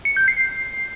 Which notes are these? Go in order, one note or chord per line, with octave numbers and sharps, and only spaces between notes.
C#7
G6
C7